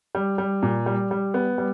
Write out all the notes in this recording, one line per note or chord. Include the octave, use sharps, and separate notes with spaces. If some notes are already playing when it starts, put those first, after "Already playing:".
G3
G3
A#2
G3
G3
B3
G3